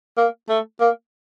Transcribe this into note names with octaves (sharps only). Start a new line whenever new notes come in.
A#3
A3
A#3